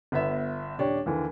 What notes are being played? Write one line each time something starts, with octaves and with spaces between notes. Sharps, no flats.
G1 B3 E5
D#1 D4 G4 C#5
D#2 D3 E3